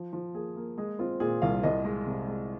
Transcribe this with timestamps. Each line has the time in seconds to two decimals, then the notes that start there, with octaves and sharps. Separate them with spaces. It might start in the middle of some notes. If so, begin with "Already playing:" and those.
Already playing: F3
0.13 F3
0.34 A#3 G#4
0.56 A#3
0.78 G#3 G#4
0.99 C4 F4
1.20 A#2 G#4
1.42 C2 F5
1.63 C2 D#5
1.85 G#3
2.06 C3
2.28 G#3